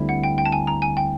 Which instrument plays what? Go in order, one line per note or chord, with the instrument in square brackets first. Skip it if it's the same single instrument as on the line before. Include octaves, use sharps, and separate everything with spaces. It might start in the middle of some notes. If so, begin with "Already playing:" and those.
Already playing: [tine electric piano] D2 D3 G3 C4 E4
[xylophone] F#5
G5
G5
A5
G#5
A#5
G#5
G5